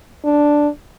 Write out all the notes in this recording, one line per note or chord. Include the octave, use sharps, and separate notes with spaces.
D4